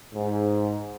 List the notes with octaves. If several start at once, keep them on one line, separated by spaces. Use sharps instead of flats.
G#2